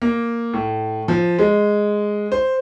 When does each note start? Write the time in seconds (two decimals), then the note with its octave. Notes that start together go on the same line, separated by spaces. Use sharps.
0.02 A#3
0.53 A2
1.08 F3
1.39 G#3
2.32 C5